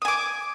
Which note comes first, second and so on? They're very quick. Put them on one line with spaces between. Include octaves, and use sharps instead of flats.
D#6 G#5 D6